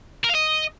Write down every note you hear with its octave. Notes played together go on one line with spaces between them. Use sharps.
A#4
F5
D#5